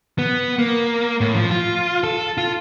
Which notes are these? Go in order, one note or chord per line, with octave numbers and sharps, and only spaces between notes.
B3
A#3
A2
F3
F4
A4
F4